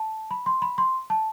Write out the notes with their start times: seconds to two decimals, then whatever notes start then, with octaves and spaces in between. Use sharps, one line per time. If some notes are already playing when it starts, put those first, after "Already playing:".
Already playing: A5
0.31 B5
0.46 C6
0.62 B5
0.78 C6
1.10 A5